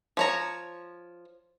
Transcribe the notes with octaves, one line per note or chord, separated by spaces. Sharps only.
F3 C#5 A#5